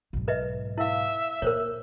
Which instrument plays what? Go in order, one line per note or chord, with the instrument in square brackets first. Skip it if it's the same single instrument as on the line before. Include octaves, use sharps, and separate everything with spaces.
[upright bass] B1 G#2
[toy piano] B4 D#5 E5
[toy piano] E4 F5 [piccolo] E5
[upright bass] A#2 [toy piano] A#4 C5 C#5